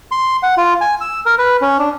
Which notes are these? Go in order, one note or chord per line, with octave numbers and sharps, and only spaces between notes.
C6
F#5
F4
G#5
E6
A#4
B4
C#4
D4